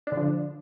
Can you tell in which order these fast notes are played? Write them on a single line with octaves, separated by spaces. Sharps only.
D4 D3 F3